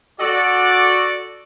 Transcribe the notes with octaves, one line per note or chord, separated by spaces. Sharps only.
F#4 A4 D5